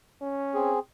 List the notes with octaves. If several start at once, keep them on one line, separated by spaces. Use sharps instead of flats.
C#4
C4 G#4